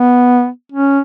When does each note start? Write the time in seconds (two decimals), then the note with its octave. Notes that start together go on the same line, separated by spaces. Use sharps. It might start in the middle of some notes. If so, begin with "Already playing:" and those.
Already playing: B3
0.72 C#4